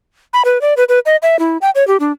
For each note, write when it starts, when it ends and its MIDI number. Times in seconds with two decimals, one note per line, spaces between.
0.33 0.43 83
0.45 0.61 71
0.61 0.74 74
0.77 0.84 71
0.89 0.99 71
1.06 1.16 75
1.23 1.39 76
1.39 1.58 64
1.62 1.70 79
1.75 1.86 73
1.88 1.97 67
2.00 2.12 62